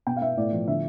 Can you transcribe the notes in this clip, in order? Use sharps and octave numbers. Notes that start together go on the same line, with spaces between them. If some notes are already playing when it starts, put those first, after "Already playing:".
B2 G5
F5
B3 E5
A2 D5
F3
D3 E5